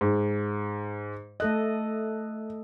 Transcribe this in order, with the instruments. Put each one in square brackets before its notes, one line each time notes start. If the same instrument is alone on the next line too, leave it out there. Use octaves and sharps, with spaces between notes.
[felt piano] G#2
[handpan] A3 A4 D#5 [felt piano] F#6